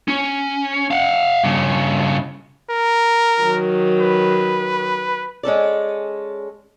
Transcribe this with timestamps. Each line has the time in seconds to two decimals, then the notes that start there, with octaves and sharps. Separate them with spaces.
0.08 C#4
0.91 F5 F#5
1.43 G2 C#3
2.70 A#4
3.42 D#3 F#3
4.01 B4
5.43 G#3 C#4 A4 D5